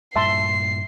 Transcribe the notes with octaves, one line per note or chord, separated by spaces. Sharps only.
G2 A#2 E5 A5 C6 C7